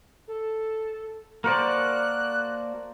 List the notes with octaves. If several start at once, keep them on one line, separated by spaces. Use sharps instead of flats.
A4
A#3 F#4 A#4 C5 D5 A5 F#6